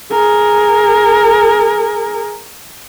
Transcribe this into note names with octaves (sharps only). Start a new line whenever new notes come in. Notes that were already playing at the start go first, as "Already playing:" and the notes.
G#4 A#4